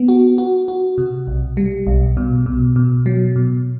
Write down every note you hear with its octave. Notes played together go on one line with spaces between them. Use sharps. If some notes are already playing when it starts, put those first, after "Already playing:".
Already playing: B3
F#4
F#4
F#4
C3
B1
G3
B1
B2
B2
B2
F#3
B2